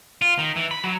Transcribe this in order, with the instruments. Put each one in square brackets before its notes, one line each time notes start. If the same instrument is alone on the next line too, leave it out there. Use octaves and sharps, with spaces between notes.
[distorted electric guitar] F4
D#3
E3
B5
F#3